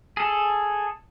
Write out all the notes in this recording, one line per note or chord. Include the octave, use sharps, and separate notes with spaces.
G#4 A4